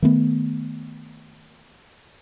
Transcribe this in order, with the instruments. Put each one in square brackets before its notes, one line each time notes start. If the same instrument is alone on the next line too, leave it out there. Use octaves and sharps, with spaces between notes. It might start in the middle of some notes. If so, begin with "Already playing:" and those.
[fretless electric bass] D#3 A3 B3